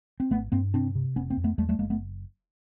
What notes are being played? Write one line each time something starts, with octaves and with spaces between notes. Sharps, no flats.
C4
G#1 A3 B3
G2 A#3 C4
C3 C4 D4
C3
F1 B3 C#4
A#3 C4
F2
A3 B3
E2 G3 A3
G3 A3
F#1 G#3 A#3
A3 B3